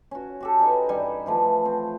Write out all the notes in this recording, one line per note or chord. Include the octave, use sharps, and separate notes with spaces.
C#4 F#4
F#4 G4 A4
D#4 B4 F#5 G#5
G2 G3 G#5
E3 F3 A3
C4